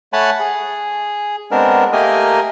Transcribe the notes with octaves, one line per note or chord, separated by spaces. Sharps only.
A3 C#5 F#5 G#5 A5 B5
G#4
G#3 B3 C4 D4 A#4
A3 A#3 G4 A#4 D#5 G#5